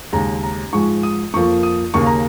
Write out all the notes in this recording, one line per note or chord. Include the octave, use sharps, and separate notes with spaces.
D#2 C#3 G#3 A#5
A#5
G#2 F3 G#3 C#6
D#6
F2 F3 A#3 C#6
D#6
D#2 C#3 A#3 C#6
A#5